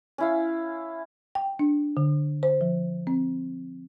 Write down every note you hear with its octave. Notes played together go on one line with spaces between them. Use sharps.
C#4 E4 F5
G5
D4
D3
C5
F3
C4